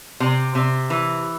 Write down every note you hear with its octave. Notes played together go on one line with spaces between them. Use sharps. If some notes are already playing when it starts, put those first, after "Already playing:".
C3
C3
E3